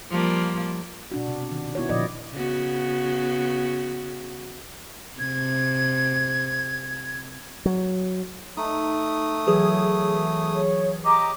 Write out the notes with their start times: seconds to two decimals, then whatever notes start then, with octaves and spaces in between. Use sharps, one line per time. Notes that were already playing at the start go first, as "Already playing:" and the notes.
0.10 F3 G3 A#3
1.12 B2 D4 F#4
1.28 C3
1.52 D#3
1.75 B3 E4 F#4 C#5
1.89 A#2 D3 F3 D5 D#5
2.33 C#3 B3 F#4
5.19 C3 G#6
7.66 F#3
8.57 A3 D#4 D#6
9.47 E3 F#3 G#4
10.53 C#5
11.05 G4 D#5 A#5 D6